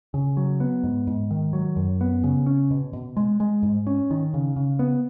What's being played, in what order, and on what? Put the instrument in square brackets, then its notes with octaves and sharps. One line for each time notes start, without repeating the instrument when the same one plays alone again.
[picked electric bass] C#3
F#3
B3
G#2
G#2
D#3
F#3
F#2
B3
C#3
C#4
B2
B2
G#3
G#3
G#2
C#4
D#3
C#3
C#3
B3